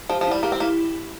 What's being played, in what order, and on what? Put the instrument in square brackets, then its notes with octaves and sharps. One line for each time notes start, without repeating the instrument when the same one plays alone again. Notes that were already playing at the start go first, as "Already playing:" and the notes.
[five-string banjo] F3 [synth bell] G4
[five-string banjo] F3
[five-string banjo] G3 [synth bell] E4
[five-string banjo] A#3 [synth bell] G4
[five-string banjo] C4
[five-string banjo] A#3 [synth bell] E4